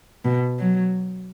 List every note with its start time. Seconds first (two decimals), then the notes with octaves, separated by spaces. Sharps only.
0.25 B2
0.59 F#3